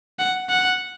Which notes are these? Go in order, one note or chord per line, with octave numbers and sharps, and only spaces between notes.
F#5
F#5